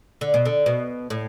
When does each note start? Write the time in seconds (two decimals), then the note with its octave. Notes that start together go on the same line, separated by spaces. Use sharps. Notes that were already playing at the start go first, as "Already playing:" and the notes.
0.21 D3
0.34 B2
0.45 D3
0.66 B2
1.10 A2